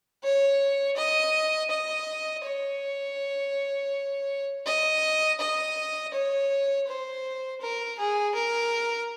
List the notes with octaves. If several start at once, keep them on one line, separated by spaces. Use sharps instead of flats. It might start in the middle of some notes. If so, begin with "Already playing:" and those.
C#5
D#5
D#5
C#5
D#5
D#5
C#5
C5
A#4
G#4
A#4